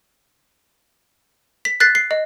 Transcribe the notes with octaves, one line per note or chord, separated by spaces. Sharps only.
B6
F#6 A6 B6 C7
C7
D#5